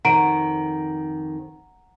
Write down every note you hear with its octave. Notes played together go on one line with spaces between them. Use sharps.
F2 D#3 F#5 A#5 D7